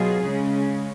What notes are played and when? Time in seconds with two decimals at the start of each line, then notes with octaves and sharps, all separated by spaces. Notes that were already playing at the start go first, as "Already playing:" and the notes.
Already playing: B2 F#3 F4 G#4
0.25 C#3 G#3 C#4